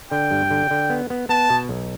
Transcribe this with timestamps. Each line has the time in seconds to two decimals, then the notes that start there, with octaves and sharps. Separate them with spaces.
0.11 D3 G5
0.31 G2
0.51 D3
0.71 D3
0.90 B3
1.10 B3
1.29 B3 A5
1.50 B2
1.69 B1